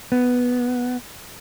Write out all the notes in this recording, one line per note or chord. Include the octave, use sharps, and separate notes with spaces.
B3